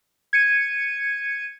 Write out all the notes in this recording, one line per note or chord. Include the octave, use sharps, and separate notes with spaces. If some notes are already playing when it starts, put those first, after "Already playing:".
G#6 C#7 D#7